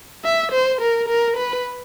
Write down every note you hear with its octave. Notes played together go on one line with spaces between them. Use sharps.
E5
C5
A#4
A#4
B4